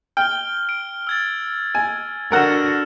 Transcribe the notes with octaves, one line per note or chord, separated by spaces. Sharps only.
G5 F6 G7
D7
E6 G#6 A6
G#5
D3 F#4 A#4 F#5 E6 F6 E7